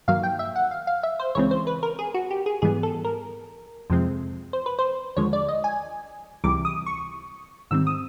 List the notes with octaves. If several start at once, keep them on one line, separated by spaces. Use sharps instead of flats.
G2 D#3 F#3 A#3 F5
G5
E5
F#5
F5
F5
E5
C5
C#2 C#3 E3 G#3 C4 C#5
C5
B4
A#4
G#4
F#4
G4
G#4
G#2 E3 G3 B3 G#4
A4
A#4
F2 C3 F3 G#3 C4
C5
B4
C5
D#2 D3 F3 G#3 C#5
D5
D#5
G#5
C#2 C3 E3 G3 D6
D#6
C#6
G#2 D#3 G3 C4 E6
D#6